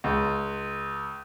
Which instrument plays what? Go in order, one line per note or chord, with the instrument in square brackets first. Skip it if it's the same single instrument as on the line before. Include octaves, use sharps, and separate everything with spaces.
[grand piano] C#2